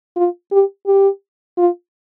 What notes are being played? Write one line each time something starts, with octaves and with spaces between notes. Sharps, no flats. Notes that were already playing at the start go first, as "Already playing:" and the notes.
F4
G4
G4
F4